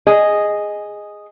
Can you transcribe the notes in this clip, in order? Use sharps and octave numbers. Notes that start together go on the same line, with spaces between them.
G#4 D#5